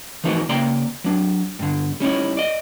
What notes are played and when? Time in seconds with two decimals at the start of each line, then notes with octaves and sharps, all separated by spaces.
0.24 E3 F3 D#4 F#4 G#4 A#4
0.49 C#3 A#3 D5 G5 A#5 C6
1.04 F#3 D4
1.59 G2 D3
2.00 G3 C#4 D#4 E4
2.37 D5 D#5